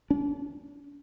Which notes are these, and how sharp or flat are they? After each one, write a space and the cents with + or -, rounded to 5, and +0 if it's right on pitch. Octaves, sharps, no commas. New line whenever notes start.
D4 -40